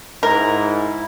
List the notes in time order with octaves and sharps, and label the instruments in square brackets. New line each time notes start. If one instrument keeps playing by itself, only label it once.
[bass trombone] G#2 [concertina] E4 [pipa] A#4